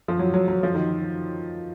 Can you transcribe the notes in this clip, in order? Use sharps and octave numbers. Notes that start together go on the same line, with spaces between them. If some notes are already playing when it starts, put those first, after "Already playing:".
F3
F#3
F#3
F#3
F3
D#3